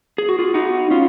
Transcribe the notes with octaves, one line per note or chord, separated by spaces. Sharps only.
G#4
F#4
F4 G#4
D#4 F#4
C#4 F4